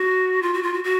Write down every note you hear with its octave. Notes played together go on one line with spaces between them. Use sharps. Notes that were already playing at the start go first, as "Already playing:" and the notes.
Already playing: F#4
F4
F#4
F4
F#4
F#4